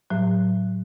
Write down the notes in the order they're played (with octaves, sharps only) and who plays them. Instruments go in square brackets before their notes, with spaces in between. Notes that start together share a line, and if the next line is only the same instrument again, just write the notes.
[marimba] A2 F#3